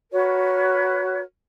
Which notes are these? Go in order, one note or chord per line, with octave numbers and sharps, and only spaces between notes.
F#4 A#4 B4 C#5